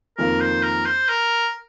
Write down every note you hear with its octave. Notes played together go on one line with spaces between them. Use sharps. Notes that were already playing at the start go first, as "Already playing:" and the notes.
F2 D#3 A#3 A#4
C5
A#4
C5
A#4